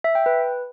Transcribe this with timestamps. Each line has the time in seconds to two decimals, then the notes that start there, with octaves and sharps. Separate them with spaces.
0.04 E5
0.15 G5
0.26 B4